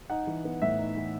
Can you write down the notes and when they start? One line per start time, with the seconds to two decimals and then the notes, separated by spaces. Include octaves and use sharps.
0.10 D#4 F#5
0.27 E3
0.44 B3
0.62 A2 E5
0.79 D#4
0.96 E3